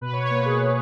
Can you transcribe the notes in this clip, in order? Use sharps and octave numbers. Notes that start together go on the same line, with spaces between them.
B2 B4
B2 C#5
C#5
A#3 B4
B2 G#4
B2